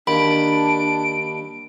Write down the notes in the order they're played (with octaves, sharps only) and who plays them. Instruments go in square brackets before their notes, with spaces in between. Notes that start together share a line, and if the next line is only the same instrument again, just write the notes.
[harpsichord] D#2 [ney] D4 [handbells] B5 [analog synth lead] D7